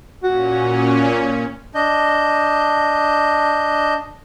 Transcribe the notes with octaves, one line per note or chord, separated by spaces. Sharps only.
A#2 C#4 F#4
D4 D#5 G6